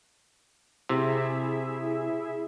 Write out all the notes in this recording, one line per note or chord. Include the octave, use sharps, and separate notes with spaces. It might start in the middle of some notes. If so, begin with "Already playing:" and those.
C3 E4 G#4 E5